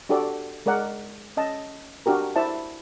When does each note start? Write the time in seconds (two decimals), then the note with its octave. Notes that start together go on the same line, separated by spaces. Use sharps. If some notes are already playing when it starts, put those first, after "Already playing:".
0.09 D4 F#4 G4 A4 D5
0.66 G#3 A#4 D5 F#5
1.37 C#4 D#5 A5
2.06 D4 F#4 G4 A#4
2.36 E4 C5 D5 E5 A5